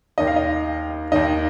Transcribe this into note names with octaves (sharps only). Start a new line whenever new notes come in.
D#2 D#3 D#5
F5
D#5
D#2 D#3 D#5